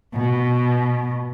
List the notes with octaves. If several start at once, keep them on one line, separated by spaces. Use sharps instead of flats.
B2